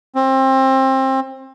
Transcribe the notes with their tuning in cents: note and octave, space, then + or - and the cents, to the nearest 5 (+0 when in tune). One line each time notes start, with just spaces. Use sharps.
C4 +25